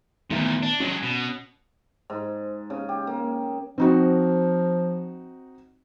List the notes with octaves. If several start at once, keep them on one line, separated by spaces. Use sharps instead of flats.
E2 A#2 D#3 A3 B3
D4
F#3 G#3 C#4
B2
G#2
C#3
G4
A#3
F3 C4 D#4 F#4